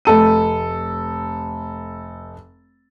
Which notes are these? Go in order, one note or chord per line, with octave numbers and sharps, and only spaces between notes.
F1 A4 D#7